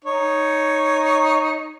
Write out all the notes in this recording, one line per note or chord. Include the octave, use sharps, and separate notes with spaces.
D#4 C#5